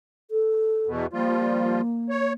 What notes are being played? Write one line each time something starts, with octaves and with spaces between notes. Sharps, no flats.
A4
E2 B2
F3 G3 A#3 F4
C#5